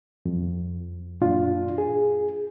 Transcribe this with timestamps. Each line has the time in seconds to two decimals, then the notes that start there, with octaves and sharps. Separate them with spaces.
0.26 F2
1.21 F#2 A#2 D4 F4
1.78 G#4